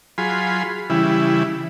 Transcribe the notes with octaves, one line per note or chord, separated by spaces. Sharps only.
F#3 F4 G#4 B5 C6
C#3 E3 G3 E4